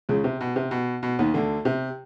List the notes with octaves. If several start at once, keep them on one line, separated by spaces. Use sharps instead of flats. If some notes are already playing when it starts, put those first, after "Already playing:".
C#2 C#3
C3
B2
C3
B2
B2
D#2 D#3
D2 D3
C3